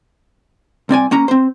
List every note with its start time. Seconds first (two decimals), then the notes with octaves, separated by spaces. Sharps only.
0.89 C2 C4 D5 G#5
1.11 A#3 C#4 A#5
1.28 C4 C5